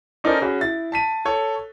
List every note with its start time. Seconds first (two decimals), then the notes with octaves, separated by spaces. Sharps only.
0.24 C#4 D#4 A4 A#4 C5 D5
0.42 C#4 F#4 G#4 B5
0.61 E4 A6
0.92 A5 B6 D#7
1.25 A4 C#5